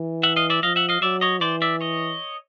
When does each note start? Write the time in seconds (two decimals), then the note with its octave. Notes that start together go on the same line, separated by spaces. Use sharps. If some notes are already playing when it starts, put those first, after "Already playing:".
Already playing: E3
0.23 E5 F#5
0.36 D#5 F5
0.50 D5 E5
0.63 F3 D#5 F5
0.76 E5 F#5
0.89 D#5 F5
1.02 F#3 D5 E5
1.21 C#5 D#5
1.41 E3 C5 D5
1.62 D5 E5
1.81 C#5 D#5